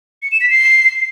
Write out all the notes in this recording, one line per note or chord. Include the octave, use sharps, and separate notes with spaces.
C#7
E7
B6
C7